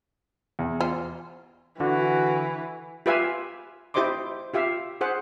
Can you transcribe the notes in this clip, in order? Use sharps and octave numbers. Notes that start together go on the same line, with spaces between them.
E2
F4 C5
D3 E3 F#4
F4 G4 B4 E5 F5 G#5
E4 G4 C5 D#5 C6 D6
F4 G4 E5 F5
G#4 C5 F#5